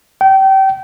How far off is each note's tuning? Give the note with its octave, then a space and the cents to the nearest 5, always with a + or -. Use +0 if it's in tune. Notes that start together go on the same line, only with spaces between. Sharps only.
G5 -25